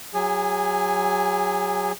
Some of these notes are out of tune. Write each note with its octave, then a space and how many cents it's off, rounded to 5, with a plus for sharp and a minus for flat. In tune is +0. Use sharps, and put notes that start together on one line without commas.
F#3 +0 G#4 -30 G#5 +0